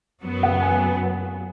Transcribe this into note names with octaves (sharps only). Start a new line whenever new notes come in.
F#2 F#3 B3
F#5
G#5